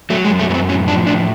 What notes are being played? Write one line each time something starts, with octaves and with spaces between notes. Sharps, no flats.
F#3 A3
G#3
F#2
A3
F#2 B3
C4
A2 C#4
F3 D4
A2 D4